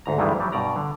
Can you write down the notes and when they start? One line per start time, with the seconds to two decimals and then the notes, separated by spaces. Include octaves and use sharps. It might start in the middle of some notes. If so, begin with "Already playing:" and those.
0.06 D2 G#2 A#5
0.18 D2 G2 D#3 E3 G3 G#3
0.40 F#3 G3
0.52 G2 B2 D5 A#5
0.76 D3